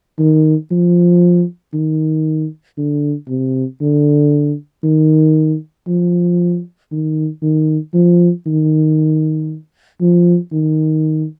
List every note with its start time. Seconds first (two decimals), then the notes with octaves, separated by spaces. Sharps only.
0.19 D#3
0.71 F3
1.74 D#3
2.78 D3
3.28 C3
3.81 D3
4.83 D#3
5.88 F3
6.92 D#3
7.42 D#3
7.94 F3
8.46 D#3
10.01 F3
10.52 D#3